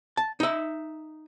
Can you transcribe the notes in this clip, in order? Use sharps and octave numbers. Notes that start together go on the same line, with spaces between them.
A5
D#4 E5